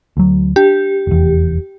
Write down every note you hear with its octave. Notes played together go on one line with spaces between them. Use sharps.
D2 F#3
D4 G4
F1 E2